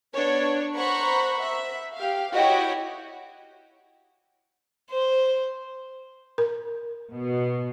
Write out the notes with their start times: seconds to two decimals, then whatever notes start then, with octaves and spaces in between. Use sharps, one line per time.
0.14 B3 D4 C#5
0.76 C5 F#5 A#5 B5 C#6
1.42 E5
1.95 G4 F5
2.34 E4 F#4 G4 C#5 D#5 G5
4.90 C5
6.38 A#4
7.12 B2 B3